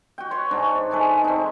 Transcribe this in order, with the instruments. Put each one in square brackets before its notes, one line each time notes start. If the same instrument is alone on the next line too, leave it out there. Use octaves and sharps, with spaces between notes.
[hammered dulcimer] F#4 G5
B4 C#5 C6 C#6
G#2 D4 C#6
E3 G#3 A4 B4
C4 D#4